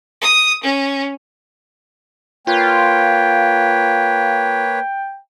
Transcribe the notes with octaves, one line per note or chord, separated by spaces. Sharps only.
D#6
C#4
A#3 F4 B4 C#5 G5